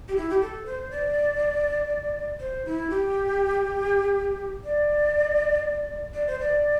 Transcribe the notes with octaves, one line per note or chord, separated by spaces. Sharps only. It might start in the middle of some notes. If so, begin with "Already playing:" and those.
G4
E4
G4
A4
C5
D5
C5
E4
G4
D5
D5
C5
D5